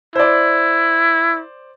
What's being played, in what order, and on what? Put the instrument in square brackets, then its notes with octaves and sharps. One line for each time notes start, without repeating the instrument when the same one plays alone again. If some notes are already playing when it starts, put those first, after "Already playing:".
[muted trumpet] E4 [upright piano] C5 D5